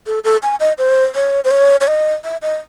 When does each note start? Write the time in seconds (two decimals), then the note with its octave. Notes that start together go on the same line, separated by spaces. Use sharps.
0.07 A4
0.24 A4
0.43 G#5
0.60 D#5
0.78 C5
1.15 C#5
1.45 C5
1.51 C#5
1.81 C#5
1.87 D#5
2.24 E5
2.42 D#5